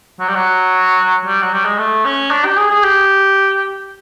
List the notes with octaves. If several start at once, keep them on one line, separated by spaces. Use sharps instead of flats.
F#3
G3
F#3
G3
F#3
G3
G#3
A3
C#4
D4
G4
G#4
G#4
G4